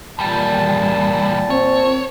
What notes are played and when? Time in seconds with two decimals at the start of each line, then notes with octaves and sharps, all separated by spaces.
0.19 E2 A#2 G3 A5
1.50 C4 C#5